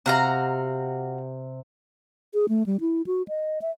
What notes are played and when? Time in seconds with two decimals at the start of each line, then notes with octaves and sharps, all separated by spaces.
0.06 C3 F#4 F5 A#5
2.34 G#4
2.49 A3
2.66 G3
2.81 E4
3.07 F#4
3.28 D#5
3.62 E5